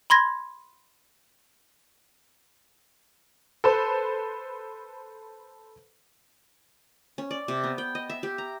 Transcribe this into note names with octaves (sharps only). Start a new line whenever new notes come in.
B5 C6 G#6 A#6
A4 B4 C5
C#4
D5
C3
B3
G5
D#5
E5
G4
A#5